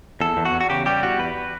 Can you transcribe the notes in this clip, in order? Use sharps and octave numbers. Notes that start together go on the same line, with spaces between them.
E2 A4
E2
F#4
E2
F#4
C#3 G4
G3 G4
E2 F#4
E2 B4